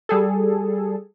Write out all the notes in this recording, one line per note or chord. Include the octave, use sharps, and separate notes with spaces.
G3 G#4 A4